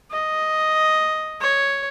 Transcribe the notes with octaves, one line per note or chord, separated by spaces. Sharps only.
D#5
C#5